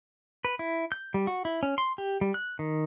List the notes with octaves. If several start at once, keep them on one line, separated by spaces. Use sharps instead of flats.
B4
E4
G6
G3
F#4
E4
C#4
C6
G4
G3
F#6
D#3